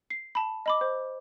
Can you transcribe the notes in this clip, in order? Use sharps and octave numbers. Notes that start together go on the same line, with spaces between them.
C7
A5 B5
D#5 B5 D6
C5